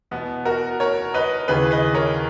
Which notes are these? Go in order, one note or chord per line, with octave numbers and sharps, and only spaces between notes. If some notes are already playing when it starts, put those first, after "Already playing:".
E2 B2 B3
F#4 A#4
A#4 C#5
B4 D#5
D#2 C#3 E3 G#4 B4
B4 D#5
A#4 C#5